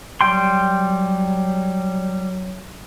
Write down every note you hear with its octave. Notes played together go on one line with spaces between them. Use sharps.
F#3 G3 G5 C6